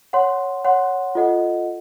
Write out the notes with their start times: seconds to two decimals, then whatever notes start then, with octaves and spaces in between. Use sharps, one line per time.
0.13 C#5 F#5 C6
0.65 C#5 F#5 C6
1.15 F4 A4 D#5 F#5